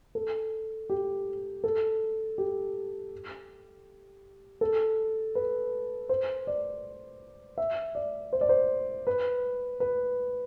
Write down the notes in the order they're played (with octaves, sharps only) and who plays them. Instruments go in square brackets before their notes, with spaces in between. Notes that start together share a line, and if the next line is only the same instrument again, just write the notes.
[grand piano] A4
G4
A4
G4
A4
B4
C5
D5
E5
D5
C5
D5
C5
B4
B4